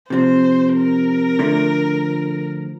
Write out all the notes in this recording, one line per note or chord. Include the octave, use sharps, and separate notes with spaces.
C3 F3 C4 C5
A#4
D3 F3 A3